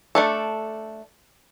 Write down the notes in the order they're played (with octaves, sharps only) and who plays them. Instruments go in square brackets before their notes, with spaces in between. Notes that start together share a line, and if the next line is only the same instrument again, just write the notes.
[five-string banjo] A3 D4 A4